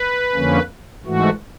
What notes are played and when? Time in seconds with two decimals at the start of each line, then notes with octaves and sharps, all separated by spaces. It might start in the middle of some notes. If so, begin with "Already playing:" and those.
Already playing: B4
0.34 F2 D3 F3 A#3 C#4
1.05 G#2 E3 A3 F#4